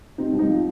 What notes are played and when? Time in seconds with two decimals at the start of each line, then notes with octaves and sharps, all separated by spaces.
0.18 C3 C4 D#4
0.33 C2
0.38 C4 D#4
0.49 F3